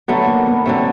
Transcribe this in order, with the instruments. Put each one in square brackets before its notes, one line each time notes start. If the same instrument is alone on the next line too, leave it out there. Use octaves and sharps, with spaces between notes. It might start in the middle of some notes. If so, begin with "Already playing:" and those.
[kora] D3 F#3 A3 [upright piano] B3
[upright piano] A#3
B3
[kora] D3 F#3 A3 [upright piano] C4